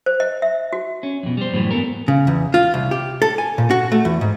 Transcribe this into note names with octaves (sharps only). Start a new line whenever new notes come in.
C5
D#5
E5
F#4
C#4
F2 B2
G3 C5
F#2 A2 E3 G3
E2 G#2 B3 A4 A#4
C#3
E2
F4
C2
G4
A4
G#5
A#2
F#4
A3
E2
G#2